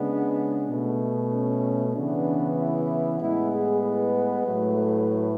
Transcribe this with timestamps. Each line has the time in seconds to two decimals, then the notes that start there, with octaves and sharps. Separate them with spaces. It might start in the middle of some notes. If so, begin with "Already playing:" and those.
Already playing: C#3 G#3 B3 D4
0.69 B2 A3
1.32 C#4
1.95 C#3 E3 B3 D4
2.58 E4
3.20 A2 G#3 B3 E4
3.52 G#4
3.83 B4
4.46 A2 F#3 A3